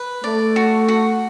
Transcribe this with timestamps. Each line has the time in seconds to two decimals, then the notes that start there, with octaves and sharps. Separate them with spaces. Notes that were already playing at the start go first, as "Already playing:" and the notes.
Already playing: B4
0.24 A3 D5
0.56 F#4
0.88 F#4